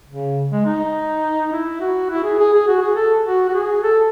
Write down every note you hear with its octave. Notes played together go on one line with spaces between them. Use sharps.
C#3
G#3
D#4
E4
F#4
E4
G#4
G#4
G#4
F#4
G#4
A4
F#4
F#4
G#4
A4